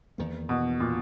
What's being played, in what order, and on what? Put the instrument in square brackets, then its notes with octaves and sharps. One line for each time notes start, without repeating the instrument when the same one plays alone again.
[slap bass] E2 D#3 A#3
[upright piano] B2
A#2